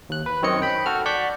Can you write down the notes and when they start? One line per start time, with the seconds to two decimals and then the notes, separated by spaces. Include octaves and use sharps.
0.09 D#2 F#6
0.26 B4
0.42 F#2 D#3 C4 C#5 D#5 C#7
0.62 G5 B5
0.86 F#4 A4 F6
1.06 D5 F#5 A5 C#6 G6 B6